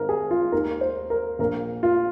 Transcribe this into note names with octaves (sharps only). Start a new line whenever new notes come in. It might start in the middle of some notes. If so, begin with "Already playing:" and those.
Already playing: G#1 G#2 A#4
G#4
F4
D#2 D#3 A#4
C5
A#4
A#1 A#2 A#4
F4